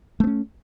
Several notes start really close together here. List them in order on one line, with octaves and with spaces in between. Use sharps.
A3 B3 C#4